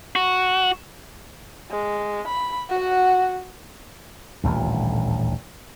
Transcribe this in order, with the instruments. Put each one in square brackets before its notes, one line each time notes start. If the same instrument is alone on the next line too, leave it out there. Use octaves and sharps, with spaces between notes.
[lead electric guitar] F#4
[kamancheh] G#3
B5
F#4 F#5
[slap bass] D#1 A1 D2